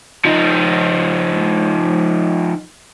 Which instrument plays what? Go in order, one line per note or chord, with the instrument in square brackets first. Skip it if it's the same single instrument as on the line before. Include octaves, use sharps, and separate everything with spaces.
[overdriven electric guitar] F3 D#4